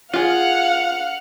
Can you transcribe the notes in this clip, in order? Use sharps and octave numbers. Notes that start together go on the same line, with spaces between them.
F4 G#4 F5 F#5